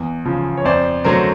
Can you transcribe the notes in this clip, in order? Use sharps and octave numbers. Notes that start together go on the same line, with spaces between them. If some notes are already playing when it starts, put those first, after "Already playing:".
Already playing: E2
C#3 F3
C#5
F2 C5 D5
D3 F#3 A3 A#4 C5